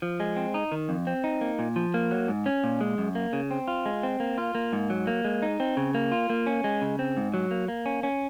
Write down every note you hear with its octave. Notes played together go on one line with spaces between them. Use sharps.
F3
G#3
C4
D#4
D#3
F2
C4
D#4
A#3
A#2
F3
A#3
F#3
G#2
C#4
A#2
G#3
F#2
A#3
C#3
C4
F4
G#3
C4
A#3
F4
A#3
G#2
F#3
A#3
G#3
D#4
C4
C#3
A#3
F4
A#3
C#4
G#3
C#3
C4
G#2
F#3
A#3
A#3
C#4
C#4